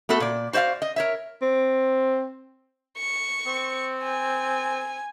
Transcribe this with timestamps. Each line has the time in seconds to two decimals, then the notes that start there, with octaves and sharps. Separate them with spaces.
0.09 A3 B3 F#4 A4
0.20 A#2 D5
0.53 F#4 C5 D5 E5 F5
0.82 D#5
0.96 A#4 C#5 E5
1.42 C4
2.97 C#6
3.47 C4
4.04 G#5